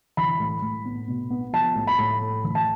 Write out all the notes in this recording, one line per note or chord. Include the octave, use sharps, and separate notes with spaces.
E3 B5
A2
A2
B3
B2
B3
F3 A5
A2
B5
A2
A3
E3
A5